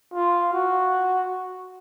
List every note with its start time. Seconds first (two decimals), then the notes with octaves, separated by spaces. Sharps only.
0.14 F4
0.53 F#4